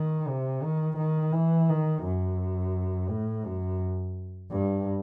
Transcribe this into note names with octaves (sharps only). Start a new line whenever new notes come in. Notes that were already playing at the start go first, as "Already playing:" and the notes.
Already playing: D#3
C3
D#3
D#3
E3
D#3
F#2
A2
F#2
G2